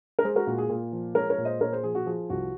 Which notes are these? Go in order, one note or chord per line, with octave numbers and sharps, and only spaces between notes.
A#4
G#3 G#4 C5
F#4 A#4
A#2 F#4
G#4
A#2
F3
G#3 A#4 C#5
A#4 C#5
A#2
C5 D#5
A#2 A#4 C#5
G#4 C5
F3 G#4
F#4
F3 G#4
C2 F#4